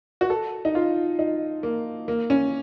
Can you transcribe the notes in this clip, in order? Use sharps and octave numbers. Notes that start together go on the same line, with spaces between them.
F#4
A4
D#4
F4
D#4
A#3
A#3
C#4